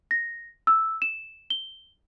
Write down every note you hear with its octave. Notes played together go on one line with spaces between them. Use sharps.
A#6
E6
E7
G7